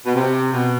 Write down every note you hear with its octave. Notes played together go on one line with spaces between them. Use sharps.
B2
C3
B2